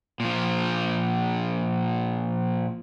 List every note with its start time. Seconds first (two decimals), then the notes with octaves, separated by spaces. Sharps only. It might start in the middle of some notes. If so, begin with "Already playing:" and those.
0.20 A#2 F3